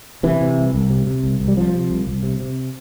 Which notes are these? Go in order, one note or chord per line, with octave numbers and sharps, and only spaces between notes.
C3 E3
C3
C2
C2
C3
C3
C2
C2
G3
C3 F3
C3
C2
C2
C3
C3